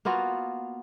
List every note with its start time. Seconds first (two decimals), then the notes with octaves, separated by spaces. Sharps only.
0.05 A#3 B3 F4 F#4